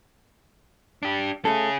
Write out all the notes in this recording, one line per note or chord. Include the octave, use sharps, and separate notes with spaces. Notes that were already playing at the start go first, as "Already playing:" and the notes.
D4 G4
A3 C#4 G#4 A4